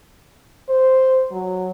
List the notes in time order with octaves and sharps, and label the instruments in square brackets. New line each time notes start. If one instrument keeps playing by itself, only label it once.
[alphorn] C5
F#3